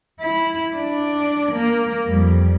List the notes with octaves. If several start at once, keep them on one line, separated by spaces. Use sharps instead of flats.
E4
D4
A#3
F2 G3